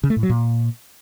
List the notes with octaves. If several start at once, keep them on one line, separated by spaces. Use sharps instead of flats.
C#3
A3
A2
F#3
A#2